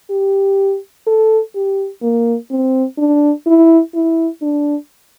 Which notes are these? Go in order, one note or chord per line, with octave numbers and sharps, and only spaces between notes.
G4
A4
G4
A#3
C4
D4
E4
E4
D4